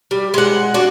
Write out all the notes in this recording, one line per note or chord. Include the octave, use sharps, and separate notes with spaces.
G3
G#3 F#5
D4 F#4